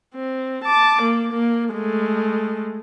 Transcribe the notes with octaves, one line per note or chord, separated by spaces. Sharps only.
C4
A5 D6
A#3
A#3
G#3 A3